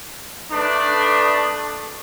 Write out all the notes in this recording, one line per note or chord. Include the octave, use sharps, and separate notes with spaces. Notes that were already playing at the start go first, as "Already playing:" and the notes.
A3 D4 B4 D#6